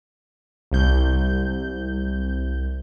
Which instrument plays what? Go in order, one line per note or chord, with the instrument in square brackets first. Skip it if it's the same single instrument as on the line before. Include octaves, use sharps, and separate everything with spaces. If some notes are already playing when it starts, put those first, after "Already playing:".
[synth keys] C2 G6